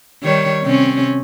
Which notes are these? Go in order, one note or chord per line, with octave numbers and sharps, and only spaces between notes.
D#3 G3 C#5
C3 C4 C#4